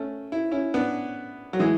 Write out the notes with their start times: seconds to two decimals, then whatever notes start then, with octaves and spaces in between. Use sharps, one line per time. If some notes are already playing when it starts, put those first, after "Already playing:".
Already playing: A3 C#4
0.32 E4
0.51 C#4 E4
0.74 B3 D4
1.53 F#3
1.59 E3 G#3